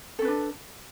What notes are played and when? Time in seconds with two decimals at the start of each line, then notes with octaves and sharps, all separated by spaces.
0.19 A4
0.22 C#4
0.25 B4
0.28 D4